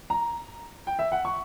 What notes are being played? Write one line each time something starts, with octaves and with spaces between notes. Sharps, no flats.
A#5
G5
E5
F#5
C#6